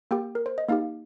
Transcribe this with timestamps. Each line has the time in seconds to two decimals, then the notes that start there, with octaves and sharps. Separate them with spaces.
0.11 A#3 G4 G5
0.35 A#4
0.46 C5
0.58 D#5
0.68 A#3 D#4 G4 F5